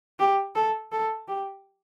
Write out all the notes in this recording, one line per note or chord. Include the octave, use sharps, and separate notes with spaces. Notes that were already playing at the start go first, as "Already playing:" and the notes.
G4
A4
A4
G4